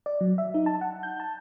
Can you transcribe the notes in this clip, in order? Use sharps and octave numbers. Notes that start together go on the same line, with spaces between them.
D5
F#3
E5
D#4
A5
F#5
G6
A5